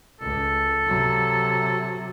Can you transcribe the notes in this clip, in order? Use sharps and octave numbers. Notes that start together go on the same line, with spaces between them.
C#2 A4
C3 F#3